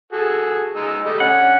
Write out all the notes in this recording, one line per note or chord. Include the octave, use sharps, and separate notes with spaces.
F#4 G#4 A4
G#3 D#4 E6
G3 A3 D#5
D3 C#4 F#5